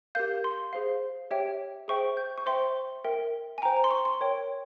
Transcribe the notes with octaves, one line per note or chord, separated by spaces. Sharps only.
G4 A#4 F5 G6
C6
G#4 C5 F5
G4 C#5 E5 G5
G#4 C5 E5 G5 C#6
G6
C#6
C5 E5 G5 C6
A#4 E5 G5
G#5
C5 G5 A#5
A#5
C6
C#6
C6
A#4 C#5 G5